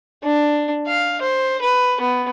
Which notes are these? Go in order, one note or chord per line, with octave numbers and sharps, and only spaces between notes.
D4
F5
C5
B4
B3